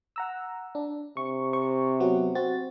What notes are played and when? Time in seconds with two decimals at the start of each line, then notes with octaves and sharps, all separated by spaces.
0.16 F#5 A#5 E6
0.75 D4
1.17 C3 C#6
1.53 C5 C#6
2.00 F#3 B3 F#4
2.35 C4 F#4 A6